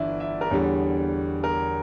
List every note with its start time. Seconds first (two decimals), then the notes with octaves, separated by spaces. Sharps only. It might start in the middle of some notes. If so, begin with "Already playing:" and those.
Already playing: G1 G2 E3 D5 E5
0.20 E5
0.41 A#4
0.51 E2 D3 G3 C#5
1.44 A#4